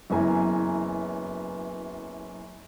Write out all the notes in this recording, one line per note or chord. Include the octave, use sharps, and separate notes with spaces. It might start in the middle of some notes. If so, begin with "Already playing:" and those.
F#1 F#2 E3 B3 G#5 A#5